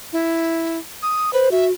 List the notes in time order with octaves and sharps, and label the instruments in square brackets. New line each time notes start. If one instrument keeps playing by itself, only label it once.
[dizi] E4
D#6
[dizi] B4 [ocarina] C5
[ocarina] F#4 [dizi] E5